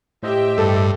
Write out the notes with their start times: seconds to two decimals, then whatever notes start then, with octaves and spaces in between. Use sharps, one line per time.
0.23 A2 G4 C5 D#5 E5 G5
0.58 G2 A4